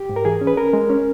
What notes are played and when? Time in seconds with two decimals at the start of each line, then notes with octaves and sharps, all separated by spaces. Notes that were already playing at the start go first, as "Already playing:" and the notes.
Already playing: G4
0.09 G#2
0.16 A#4
0.25 E3 G#4
0.41 C#4
0.47 B4
0.57 C#4 A#4
0.73 G#3
0.89 C#4